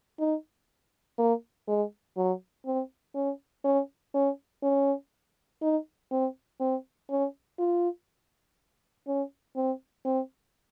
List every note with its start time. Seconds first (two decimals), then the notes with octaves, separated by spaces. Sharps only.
0.19 D#4
1.18 A#3
1.68 G#3
2.17 F#3
2.66 C4
3.15 C#4
3.64 C#4
4.14 C#4
4.63 C#4
5.61 D#4
6.11 C4
6.60 C4
7.10 C#4
7.59 F4
9.07 C#4
9.56 C4
10.05 C4